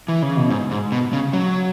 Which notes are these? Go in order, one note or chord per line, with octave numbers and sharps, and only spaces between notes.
E3
C#3
B2
G#2
G#2
B2
C#3
F#3